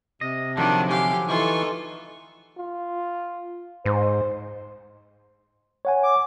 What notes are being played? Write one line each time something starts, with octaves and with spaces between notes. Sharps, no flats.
C3 D#5
D3 D#3 F3 F#3 D4 A5
G4 F5 G#5
E3 D#4 F4 A4 C#6
F4
G#2 C5
C#5 F#5 G#5
D6